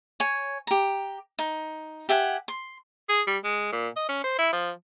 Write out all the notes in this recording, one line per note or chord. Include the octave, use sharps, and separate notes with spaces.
C#5 G#5
G4 A#5
D#4
G4 E5 F#5 G#5
C6
G#4
G3
G#3
A#2
D#5
C#4
C5
E4
F3